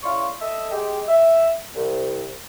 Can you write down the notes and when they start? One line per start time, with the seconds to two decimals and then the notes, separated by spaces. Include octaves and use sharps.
0.03 C#3 E4 D5 F5 C6 C#6
0.41 A4 D#5 E5
0.72 G#3 G4
1.08 E5
1.75 C2